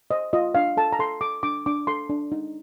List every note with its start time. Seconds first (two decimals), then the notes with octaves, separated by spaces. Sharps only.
0.11 C5 D#5
0.33 F4 D#5
0.55 D4 F5
0.77 A4 A5
0.93 A#5
0.99 A4 C6
1.21 A4 D6
1.43 D4 D6
1.66 D4 D6
1.87 A4 C6
2.10 D4
2.32 D#4